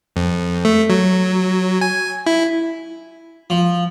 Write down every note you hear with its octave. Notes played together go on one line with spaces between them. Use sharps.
F2
A3
F#3
G#5
E4
F3